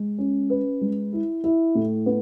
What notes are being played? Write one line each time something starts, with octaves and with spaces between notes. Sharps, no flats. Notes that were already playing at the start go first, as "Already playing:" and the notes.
Already playing: G#3
C#4
B4
G#3
E4
E4
A2
B3